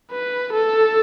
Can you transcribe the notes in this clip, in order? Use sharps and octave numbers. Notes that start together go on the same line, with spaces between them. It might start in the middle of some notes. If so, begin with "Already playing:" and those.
B4
A4